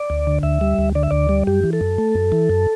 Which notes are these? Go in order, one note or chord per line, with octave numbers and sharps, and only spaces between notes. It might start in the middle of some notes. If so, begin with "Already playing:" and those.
Already playing: D5
D2
D3
D2 E5
G3
D2
D3 D5
E5
D2 D5
G3
F#2 G4
E3
A4
F#2
A3
F#2
E3
F#2